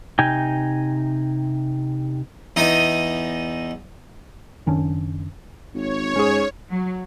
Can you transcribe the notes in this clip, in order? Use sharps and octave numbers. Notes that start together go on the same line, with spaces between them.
C3 D#4 G5 G#5
E2 D#4 D#5
F#1 D#3 C#4 D4
G#1 C#5
G#2 C#4 G#4
F#3